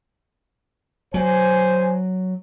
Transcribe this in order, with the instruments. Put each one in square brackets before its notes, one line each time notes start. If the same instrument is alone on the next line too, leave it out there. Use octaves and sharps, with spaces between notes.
[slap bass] F#3 [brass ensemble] C5 G#5